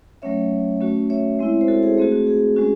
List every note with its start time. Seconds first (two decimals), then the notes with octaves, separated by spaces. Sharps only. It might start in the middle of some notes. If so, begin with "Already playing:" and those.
0.22 F#3 A3 C#4 C#5 E5
0.81 A3 C#4 F#4
1.10 C#5 E5
1.39 G#3 C4 E4
1.61 C5
1.68 F#4 A4
1.83 G#4 C5
1.97 A3 C4 F#4 G#4
2.12 F#4
2.27 G#4
2.56 G#3 C#4 F#4